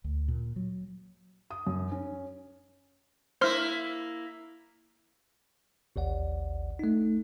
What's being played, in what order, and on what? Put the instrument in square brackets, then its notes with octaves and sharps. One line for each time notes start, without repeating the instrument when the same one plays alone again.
[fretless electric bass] D2
A#2
F#3
[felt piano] D#6
F#2
C#4
[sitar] A#3 E4 [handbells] C5 C6 F6
[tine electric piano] A1 D#2 D5 F#5
A3 D#4